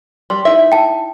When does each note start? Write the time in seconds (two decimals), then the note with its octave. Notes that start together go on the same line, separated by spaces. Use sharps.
0.30 G3 C6
0.45 D#4 E4 E5
0.72 G5 A5